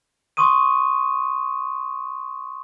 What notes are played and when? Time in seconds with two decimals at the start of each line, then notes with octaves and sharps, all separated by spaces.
0.37 C6 C#6 D#6 D#7